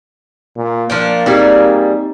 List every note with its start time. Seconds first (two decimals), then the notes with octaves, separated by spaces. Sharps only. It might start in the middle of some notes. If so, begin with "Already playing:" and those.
0.57 A#2
0.90 F3 A#3 D4 G5
1.26 G3 C4 D#4 G4 G#4